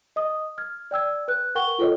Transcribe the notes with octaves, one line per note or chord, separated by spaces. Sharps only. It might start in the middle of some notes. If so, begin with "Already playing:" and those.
D#5 D#6
F6 G#6
D5 G5 E6 G#6
B4 F#6
A#4 F#5 G5 C#6 G7
F4 A4 B4 C#5 D#5